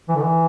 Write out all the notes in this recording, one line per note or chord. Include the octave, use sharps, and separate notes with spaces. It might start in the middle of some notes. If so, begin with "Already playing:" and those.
E3
D3
E3